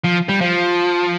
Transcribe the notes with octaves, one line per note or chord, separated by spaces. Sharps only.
F3
G3
F3